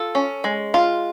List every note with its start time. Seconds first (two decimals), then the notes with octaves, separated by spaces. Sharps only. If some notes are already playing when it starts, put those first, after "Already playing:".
Already playing: F4 A4
0.15 C#4
0.44 G#3
0.74 F4